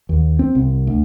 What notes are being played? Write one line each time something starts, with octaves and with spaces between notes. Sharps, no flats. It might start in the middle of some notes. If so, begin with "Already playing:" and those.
D#2
C4
C2
D2